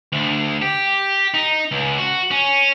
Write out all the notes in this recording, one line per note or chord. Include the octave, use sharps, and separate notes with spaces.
D2
G4
D#4
C#2
F#4
C#4